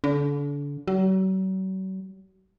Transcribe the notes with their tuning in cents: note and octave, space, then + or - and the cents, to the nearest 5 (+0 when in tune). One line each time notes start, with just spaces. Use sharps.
D3 -35
F#3 +40